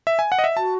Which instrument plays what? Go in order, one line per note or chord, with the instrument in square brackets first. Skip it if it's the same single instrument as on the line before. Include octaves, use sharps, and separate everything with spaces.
[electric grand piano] E5
G#5
F#5
D#5
E5
[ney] F#4 [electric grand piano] A5